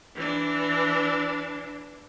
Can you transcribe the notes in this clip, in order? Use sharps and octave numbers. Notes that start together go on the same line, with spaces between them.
E3 D4